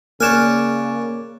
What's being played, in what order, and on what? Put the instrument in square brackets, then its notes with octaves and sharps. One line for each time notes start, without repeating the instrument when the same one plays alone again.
[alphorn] C#3 [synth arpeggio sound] A#3 [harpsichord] C#5 D5 G#5 [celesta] F6 F#6 E7